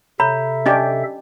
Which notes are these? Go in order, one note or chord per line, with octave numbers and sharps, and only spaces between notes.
C3 A4 C#5 E5 A#5 B5
C#4 D4 G4 D#5